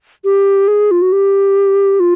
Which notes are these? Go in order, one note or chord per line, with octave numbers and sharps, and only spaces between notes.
G4
G#4
F4
F#4
G4
F4